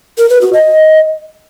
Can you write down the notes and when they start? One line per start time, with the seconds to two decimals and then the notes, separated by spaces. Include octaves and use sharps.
0.18 A#4
0.30 B4
0.41 F#4
0.53 D#5